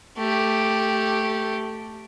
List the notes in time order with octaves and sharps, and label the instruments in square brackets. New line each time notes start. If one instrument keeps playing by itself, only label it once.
[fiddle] A3 G4